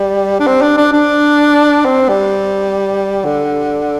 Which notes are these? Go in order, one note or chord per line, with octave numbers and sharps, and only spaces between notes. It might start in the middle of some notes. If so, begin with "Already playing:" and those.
Already playing: G3
D4
C4
D4
D4
D4
C4
G3
D3